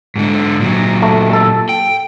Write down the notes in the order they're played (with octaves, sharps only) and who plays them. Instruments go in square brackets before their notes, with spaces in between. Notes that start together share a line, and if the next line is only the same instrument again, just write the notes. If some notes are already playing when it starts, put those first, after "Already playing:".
[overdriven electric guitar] G#2 D3
A#2 F#3
[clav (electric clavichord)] A3
A4
[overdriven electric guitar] G5